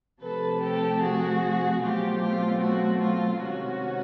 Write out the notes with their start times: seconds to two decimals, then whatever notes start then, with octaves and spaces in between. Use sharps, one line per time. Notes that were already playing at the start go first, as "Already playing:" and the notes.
0.21 C3 F3 A3 A4 B4
0.60 G4 A4
1.00 F#4 G#4
1.81 B2 F#3 A3 C4 F4 G4
2.21 F4
2.61 F#4
3.01 F4
3.41 C3 D#3 G#3 C#4 F#4